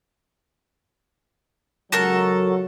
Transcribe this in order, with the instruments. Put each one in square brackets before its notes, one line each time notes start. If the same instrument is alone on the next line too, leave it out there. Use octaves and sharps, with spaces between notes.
[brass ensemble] C#2 F#3 [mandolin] F#4 A4 A#4